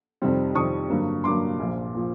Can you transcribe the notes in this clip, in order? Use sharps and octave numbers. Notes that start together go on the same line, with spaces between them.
F2 C3 D#3 G3 C4
F2 C3 D#3 G3 C4 C#6 D#6
G2 D3 F#3 A#3
G2 D3 F#3 A#3 C6 D6
A#1 A#2 F3
A#2 F3